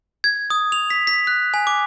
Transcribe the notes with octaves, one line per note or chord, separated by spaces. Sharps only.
G#6
D#6
F7
B6
B6
F#6
G#5
D6